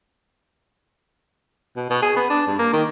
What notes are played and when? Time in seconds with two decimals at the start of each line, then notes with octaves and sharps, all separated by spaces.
1.77 B2
1.90 B2
2.02 G#4
2.17 B3
2.30 D4
2.47 G2
2.59 A#3
2.73 D#3